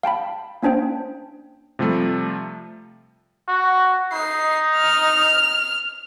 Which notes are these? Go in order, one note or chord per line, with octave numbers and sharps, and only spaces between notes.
F5 G5 A5 B5
A#3 C#4 D4 C5 G5
C3 F3 G3 A3
F#4
D#4 C7
F6